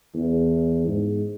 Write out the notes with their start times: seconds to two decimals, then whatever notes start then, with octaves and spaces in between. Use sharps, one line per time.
0.14 E2
0.87 G#2